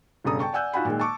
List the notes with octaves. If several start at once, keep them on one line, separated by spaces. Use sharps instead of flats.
E1 G2 C#3 A4 A#5 D#6
G5 A5 C#6
D5 F#5 G#5 E6 F#6 G6
D#4 F4 F#4 F#5 G#5 B5
A#2 D#3 G#3
A5 C#6 D6